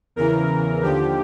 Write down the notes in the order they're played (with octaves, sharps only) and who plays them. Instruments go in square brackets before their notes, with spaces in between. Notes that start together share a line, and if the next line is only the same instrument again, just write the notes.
[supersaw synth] E2 C#3 E3 A#4
D#2 D3 F3 G4